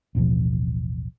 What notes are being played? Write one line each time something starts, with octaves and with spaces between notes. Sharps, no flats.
A1 D#2 B2 F3